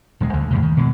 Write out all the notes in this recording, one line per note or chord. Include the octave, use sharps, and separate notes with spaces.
D#1 D#3 G#3
D2 D3
F2 A2 C3
D#3
B2 G#3